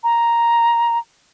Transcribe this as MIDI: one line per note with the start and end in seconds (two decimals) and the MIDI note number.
0.04 0.98 82